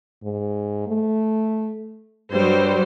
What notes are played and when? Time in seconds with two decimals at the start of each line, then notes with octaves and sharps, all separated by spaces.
0.23 G#2
0.87 A3
2.31 G2 F#3 G3 C5